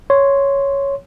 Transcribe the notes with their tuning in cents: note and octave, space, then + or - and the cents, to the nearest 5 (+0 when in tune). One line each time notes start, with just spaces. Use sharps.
C#5 +0 C6 +0